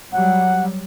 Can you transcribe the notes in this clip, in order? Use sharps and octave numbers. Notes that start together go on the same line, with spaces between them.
F#3 G3 F#5